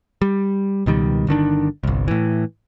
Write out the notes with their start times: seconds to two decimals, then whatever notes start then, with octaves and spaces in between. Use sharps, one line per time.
0.22 G3
0.86 C#2 B2 D#3 G3
1.27 G1 D3 D#3 D4
1.83 G1 C2
2.08 A2 E3